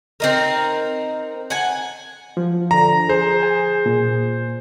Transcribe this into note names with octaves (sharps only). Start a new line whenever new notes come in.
C4 D#4 A#4
F#5 G#5
F3
D3 A#5
G#4 C5
G#5
A#2